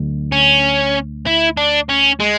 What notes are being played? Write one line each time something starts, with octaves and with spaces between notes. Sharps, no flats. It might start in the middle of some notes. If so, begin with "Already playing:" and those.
Already playing: D2 D3 F#3
C#4
E4
D4
C#4
G#3